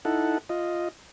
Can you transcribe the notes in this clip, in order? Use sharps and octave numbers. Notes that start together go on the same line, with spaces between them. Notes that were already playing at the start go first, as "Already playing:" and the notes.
D#4 E4 A4 F#5
F4 D#5